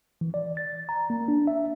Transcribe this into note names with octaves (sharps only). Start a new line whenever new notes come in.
E3
D5
A6
A#5
A#3
D4
E5